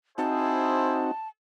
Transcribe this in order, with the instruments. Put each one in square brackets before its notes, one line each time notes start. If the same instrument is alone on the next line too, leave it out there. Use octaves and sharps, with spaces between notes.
[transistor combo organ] C4 D#4 F#4 [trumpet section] E4 G#4 C5 [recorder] A5